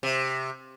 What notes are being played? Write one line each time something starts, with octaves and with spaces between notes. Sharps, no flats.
C3